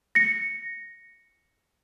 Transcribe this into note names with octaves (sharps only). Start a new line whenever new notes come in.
A#6 C#7